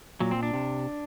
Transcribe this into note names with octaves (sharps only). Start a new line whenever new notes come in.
A#2 F#3
C4
D4
C3